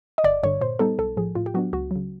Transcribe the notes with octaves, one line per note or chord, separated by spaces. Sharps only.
D#5
G1 D5
G2 D3 C#5
A#2 C5
G3 B3 D#4 A4
B1 A4
A2 F3 G#4
A2 F4
G4
F#3 B3 D4 F#4
C#2 F#4
C#3 F#3